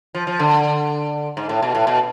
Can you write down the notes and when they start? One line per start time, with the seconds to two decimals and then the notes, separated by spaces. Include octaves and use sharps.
0.15 F3
0.27 F3
0.39 D3
1.37 G#2
1.49 A2
1.62 B2
1.75 A2
1.87 B2